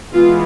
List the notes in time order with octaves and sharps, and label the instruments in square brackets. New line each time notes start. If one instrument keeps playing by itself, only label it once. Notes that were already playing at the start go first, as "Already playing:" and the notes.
[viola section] E3 G#3 B3 F4